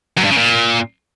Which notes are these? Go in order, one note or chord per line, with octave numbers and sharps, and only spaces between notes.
F#2
G2
C#3
A#2